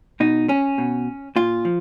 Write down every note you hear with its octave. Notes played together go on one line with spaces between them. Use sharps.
B2 D#4
C#4
B2
A#2 F4
F3